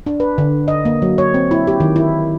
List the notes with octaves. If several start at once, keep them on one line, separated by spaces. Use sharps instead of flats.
D4
B4
D3
D#5
A#3
F#3
C#5
C4
E4
G4
D#3
E4